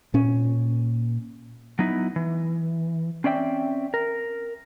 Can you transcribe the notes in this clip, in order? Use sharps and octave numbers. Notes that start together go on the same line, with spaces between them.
A#2 C#4
F#3 B3 D#4 E4
E3
C4 C#4 D5 E5 G5
A#4